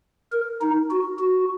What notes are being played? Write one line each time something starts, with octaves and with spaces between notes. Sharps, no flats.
A#4
D#4
F#4
F#4